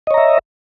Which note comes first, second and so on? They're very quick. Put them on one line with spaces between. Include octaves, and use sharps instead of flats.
D#5 C#5 A#5 E5